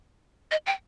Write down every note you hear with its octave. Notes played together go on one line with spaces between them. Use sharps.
D#5
G5